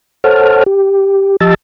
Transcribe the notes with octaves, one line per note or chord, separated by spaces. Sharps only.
A4 C5 C#5 F#5 A5 F6
G4
F3 G4 D#5 A5 E6 A6